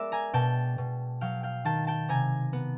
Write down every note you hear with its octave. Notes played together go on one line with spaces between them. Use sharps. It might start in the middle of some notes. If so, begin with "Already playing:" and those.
Already playing: G#3 B3 A#4 D5 E5
G#5 A#5
B2 G5 A5
B2
F#3 F5 G5
F5 G5
D#3 G5 A5
G5 A5
C3 G#5 A#5
B3